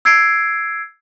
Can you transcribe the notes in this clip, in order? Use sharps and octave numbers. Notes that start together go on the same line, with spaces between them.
E6 G#6 C7 D7